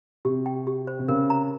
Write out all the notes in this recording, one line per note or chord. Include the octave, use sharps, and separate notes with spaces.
C3 G4
G5
G4
C5
C3
C#3 A#4
A#5